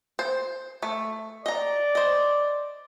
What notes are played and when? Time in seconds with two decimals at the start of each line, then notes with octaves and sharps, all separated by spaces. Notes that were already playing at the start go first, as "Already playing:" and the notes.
0.19 C5
0.83 A3
1.46 D5 D#5 A#5
1.95 C5 D#5